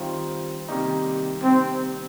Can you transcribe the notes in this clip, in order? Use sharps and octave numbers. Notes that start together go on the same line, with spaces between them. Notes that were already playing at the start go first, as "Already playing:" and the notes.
Already playing: D#3 G3 C4 F4
C3 D#3 G3 A#3 D#4
C3 D#3 G3 A#3 C4 D#4